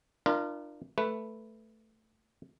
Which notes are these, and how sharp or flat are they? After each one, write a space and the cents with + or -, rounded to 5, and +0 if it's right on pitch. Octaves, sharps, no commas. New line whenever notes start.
D4 +30 F4 -20 A#4 +10
A3 +0 B4 +0